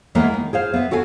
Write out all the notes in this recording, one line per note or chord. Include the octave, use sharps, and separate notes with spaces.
E3 G#3 A#3 B3
D#3
G#4 C5 F5
B3 E5
F#4 A4 F5 G#5